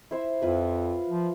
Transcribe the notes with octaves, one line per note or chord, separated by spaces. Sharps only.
E4 C5 E5
F2 F4 B4 E5
F3